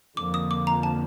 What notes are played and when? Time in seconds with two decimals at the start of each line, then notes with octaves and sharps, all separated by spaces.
0.17 F2 D3 F3 A#3 D6
0.34 D#6
0.51 D6
0.67 A#5
0.83 A5